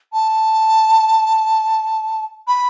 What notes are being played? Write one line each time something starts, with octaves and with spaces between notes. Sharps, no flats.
A5
B5